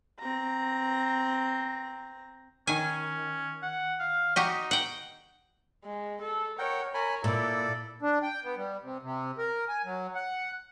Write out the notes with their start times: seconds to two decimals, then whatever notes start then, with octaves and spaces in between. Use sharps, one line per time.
0.20 C4 A#5
2.67 D#3 C#4 G#5
3.62 F#5
4.00 F5
4.36 D#4 F#4 G4 D#5
4.71 F#5 G5
5.84 G#3
6.21 A4
6.58 A#4 C#5 F#5 G5
6.94 A#4 C#5 G#5 B5
7.24 A#2 E4 A4 D5
8.02 D4
8.23 G5
8.44 B3
8.57 G3
8.83 C3
9.02 C3
9.38 A#4
9.68 G#5
9.85 F#3
10.15 F#5